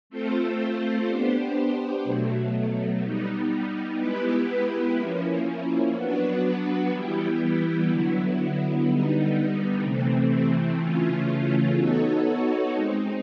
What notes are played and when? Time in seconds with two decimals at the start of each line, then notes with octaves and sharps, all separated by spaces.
0.10 A3 C4 F4 A4 C5
1.07 B3 D4 G4 C5
2.04 B2 F#3 A3
3.01 G3 B3 D#4
3.98 G#3 B3 E4 G4 B4
4.96 F3 A#3 C#4 E4
5.93 F#3 B3 D4 F#4 B4
6.90 E3 G3 B3 E4 G4
7.87 D3 F#3 B3 E4
8.84 D3 G3 B3 D#4
9.82 C3 E3 A3 C4
10.79 C#3 E3 A3 C#4 F4
11.76 B3 D#4 F#4 A4 C#5
12.73 G#3 C4 D#4